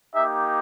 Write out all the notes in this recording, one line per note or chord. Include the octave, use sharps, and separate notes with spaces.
A#3 D#4 G4 E5